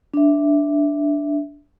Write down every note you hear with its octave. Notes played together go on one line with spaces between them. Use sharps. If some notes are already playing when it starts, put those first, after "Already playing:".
D4 E5